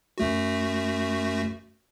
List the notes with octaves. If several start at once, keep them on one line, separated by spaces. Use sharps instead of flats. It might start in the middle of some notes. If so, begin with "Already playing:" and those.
F#2 A3 F#4